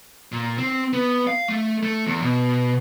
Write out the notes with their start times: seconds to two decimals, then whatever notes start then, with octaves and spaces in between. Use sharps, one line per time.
0.32 A#2
0.58 C4
0.93 B3
1.27 F5
1.48 A3
1.83 A3
2.07 E2
2.22 B2